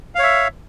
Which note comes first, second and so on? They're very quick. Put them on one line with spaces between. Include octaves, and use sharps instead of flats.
F5 C#5 E5